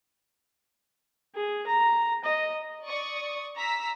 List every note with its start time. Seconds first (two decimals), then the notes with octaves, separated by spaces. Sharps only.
1.35 G#4
1.67 A#5
2.24 D#5
2.87 D5 C#6 D#6
3.57 A#5 E6 B6